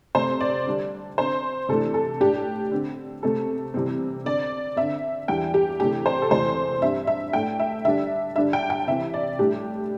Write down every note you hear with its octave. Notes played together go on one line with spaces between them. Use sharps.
C3 A3 C4 C5
D5
D3 G3 D4
D3 C4 C5
C3 E3 A3 D4 A4
A4
A2 A3 D4 G4
D3 C4
C3 A3 C4 A4
C3 E3 G3 C4
D3 C4 D5
D3 C4 E5
E2 E3 G3 D4 G5
G4
C3 E3 A3 D4 G4
C5
A4
E2 C3 E3 A3 C5
G2 G3 C4 E5
E5
A2 A3 D4 G5
E5
D3 G3 D4 E5
G2 D3 G3 D4 E5
G5
G5
C3 E3 C4 E5
D5
A2 G3 D4 G4